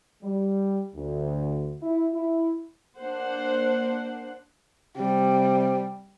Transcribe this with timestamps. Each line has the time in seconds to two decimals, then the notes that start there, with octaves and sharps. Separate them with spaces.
0.23 G3
0.95 D2
1.80 E4
2.14 E4
2.99 A#3 D4 C5 F#5
4.97 C3 G3